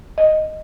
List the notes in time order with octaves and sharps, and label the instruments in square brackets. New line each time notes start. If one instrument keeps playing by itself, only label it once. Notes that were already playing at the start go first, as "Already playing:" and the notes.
[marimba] D#5